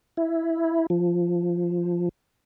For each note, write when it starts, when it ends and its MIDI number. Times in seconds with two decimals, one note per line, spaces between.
0.17 0.86 64
0.90 2.09 53